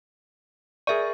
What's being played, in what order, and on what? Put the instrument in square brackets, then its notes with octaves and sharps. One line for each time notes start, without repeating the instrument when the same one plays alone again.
[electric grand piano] G#4 A#4 C#6 [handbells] D5 E5